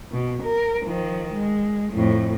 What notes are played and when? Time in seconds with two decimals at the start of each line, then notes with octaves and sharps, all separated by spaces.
0.12 B2
0.43 A#4
0.86 D#3 F3
1.34 G#3
1.92 F2 A2